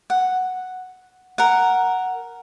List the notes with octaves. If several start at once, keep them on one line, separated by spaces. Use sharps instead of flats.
F#5
A#4 F#5